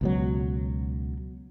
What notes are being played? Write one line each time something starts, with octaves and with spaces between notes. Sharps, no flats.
C#2 B2 F#3